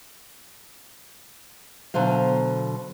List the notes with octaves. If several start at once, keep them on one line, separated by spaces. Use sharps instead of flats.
B2 D3 F#3 C5 F5